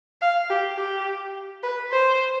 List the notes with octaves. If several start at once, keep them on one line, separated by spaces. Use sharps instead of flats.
F5
G4
G4
B4
C5